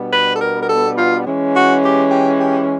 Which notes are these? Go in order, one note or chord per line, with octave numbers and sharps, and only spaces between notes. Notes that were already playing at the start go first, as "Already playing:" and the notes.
Already playing: B2 G3 B3 D4
B4
A4
A#4
A#4
A4
F4
E3 G#3 C#4
F#4
G4
G4
G4